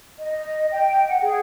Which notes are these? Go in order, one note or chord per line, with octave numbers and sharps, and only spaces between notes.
D#5
G5
F#5
G#4